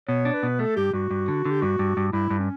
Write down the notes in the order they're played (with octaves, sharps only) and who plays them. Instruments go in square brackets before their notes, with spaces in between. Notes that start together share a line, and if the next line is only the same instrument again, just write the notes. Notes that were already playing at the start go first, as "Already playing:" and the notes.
[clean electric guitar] B2 [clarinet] C#5
[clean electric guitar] D4
[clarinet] B4
[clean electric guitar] B2
[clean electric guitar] A3 [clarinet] A4
[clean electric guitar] G2 [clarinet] G4
[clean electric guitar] G2 [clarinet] F#4
[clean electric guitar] G2
D3
D3
[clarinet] G4
[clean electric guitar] G2 [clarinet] F#4
[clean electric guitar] G2
G2
[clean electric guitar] G2 [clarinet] E4
[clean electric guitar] G2
[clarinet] C#4